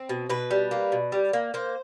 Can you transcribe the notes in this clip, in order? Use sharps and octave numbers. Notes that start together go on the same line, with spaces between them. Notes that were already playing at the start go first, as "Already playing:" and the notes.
Already playing: C4
B2
B2 B4
G3
A#3
B2
G3
A#3
A#3 C5